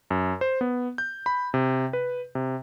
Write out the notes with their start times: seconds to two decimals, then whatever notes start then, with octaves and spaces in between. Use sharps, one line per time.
0.10 F#2
0.41 C5
0.61 B3
0.98 G6
1.26 B5
1.54 C3
1.93 B4
2.35 C3